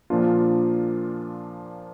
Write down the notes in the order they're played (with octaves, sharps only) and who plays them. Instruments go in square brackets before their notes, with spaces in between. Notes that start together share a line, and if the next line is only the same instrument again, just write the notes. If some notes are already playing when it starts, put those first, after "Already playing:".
[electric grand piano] A#2 F3 A#3 D4 F4